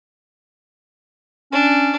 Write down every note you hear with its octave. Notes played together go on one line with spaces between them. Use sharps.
C#4 D4